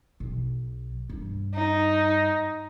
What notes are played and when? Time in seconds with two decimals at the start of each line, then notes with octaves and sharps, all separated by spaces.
0.20 B1
1.10 G2
1.54 D#4